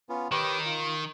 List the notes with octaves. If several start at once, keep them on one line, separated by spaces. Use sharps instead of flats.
B3 C#4 F4
D#3 G4 B4 C#5
F4